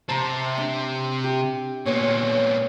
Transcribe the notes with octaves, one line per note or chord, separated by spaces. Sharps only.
C3 C4 A5 A#5
D4
G4
A#2 B3 C#5